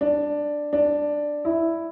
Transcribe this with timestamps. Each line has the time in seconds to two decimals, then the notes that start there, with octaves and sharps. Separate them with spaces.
0.01 D4
0.73 D4
1.45 E4